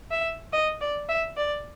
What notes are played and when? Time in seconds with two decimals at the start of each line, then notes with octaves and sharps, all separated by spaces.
0.11 E5
0.53 D#5
0.81 D5
1.09 E5
1.37 D5